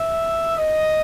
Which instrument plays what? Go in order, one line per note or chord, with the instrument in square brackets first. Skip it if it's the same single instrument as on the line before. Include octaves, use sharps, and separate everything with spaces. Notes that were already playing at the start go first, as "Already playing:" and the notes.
Already playing: [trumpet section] E5
D#5